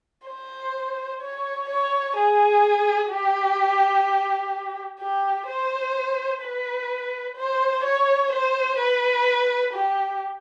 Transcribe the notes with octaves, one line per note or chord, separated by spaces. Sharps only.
C5
C#5
C#5
G#4
G4
G4
C5
B4
C5
C#5
C5
B4
G4